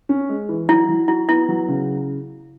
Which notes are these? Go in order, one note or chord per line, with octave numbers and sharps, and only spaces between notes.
C#4
G#3
E3
F#3 E4
F#3
E4 F#4
B3 E4
F#3
C#3